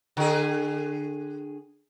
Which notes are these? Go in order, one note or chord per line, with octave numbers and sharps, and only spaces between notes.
D3 G#4